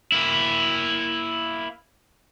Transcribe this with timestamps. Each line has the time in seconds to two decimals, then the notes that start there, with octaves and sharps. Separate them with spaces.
0.12 A#3 E4